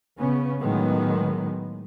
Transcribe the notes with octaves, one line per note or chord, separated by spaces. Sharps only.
C#3 B3 C#4
A2 D#3 F#3 G#3 B3